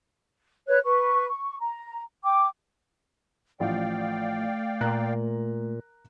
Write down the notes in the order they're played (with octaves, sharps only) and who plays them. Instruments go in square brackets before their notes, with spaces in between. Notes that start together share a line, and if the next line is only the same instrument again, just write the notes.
[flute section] B4 C#5 F#6
B4 C#6
C#6
A#5
G5 D6
[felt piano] A1 F3 [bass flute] A3 [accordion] D5 F5 G5
[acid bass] A#2 [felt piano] A#4 A#5 F#6